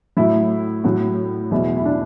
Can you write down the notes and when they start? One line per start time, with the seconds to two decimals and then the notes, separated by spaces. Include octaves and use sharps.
0.17 A2 F#3 E4
0.84 A2 F#3 F#4
1.51 E2 B2 F#3 E4
1.77 E4
1.85 D4